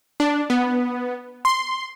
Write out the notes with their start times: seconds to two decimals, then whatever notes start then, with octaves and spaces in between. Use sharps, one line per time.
0.20 D4
0.50 B3
1.45 C6